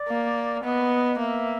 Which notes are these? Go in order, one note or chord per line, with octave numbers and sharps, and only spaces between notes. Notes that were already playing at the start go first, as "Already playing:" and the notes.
Already playing: D5
A#3
B3 D#5
A#3 E5